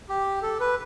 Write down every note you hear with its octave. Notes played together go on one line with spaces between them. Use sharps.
G4
A4
B4